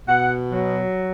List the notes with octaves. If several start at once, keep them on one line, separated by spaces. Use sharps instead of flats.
B2 F#5
F#3